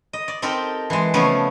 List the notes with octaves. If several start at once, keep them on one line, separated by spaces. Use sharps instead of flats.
D#5
D5
C4 D#4 G4 A4 A#4
E3 G#3
C#3 F3 A3 B3 C#5